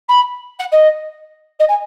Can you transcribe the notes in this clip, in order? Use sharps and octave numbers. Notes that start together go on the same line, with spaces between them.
B5
F#5
D#5
D#5
G#5